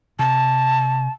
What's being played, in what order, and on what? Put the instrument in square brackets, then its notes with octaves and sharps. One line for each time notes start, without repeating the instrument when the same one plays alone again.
[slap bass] C3 [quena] A5